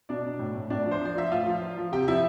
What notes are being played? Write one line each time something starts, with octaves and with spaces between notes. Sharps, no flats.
B2 D4 D5
B2
A2
A2
A2 D4 D5
F3
C5
F3 D5
F3 E5
A2 F4 F5
F3
F3
F3
C3 G4 G5
F3 E4 E5